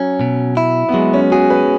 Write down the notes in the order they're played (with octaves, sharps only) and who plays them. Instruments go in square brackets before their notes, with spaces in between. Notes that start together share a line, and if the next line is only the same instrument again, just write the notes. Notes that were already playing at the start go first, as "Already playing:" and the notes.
Already playing: [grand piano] F#3 [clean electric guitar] C#4
[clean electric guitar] B2
E4
[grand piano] B3
[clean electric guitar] F#3 [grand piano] G#3
[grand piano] C#4
[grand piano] F#4 [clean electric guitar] G#4
[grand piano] B4